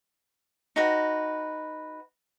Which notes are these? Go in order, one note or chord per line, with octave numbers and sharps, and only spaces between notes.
D#4 F#4 B4